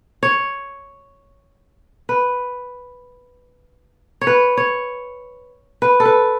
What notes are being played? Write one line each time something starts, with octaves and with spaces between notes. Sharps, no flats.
C#5
B4
C#5
B4
C#5
B4
A4
B4